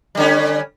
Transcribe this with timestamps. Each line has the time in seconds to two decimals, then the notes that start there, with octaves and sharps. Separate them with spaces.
0.15 G3
0.17 D3
0.20 C#4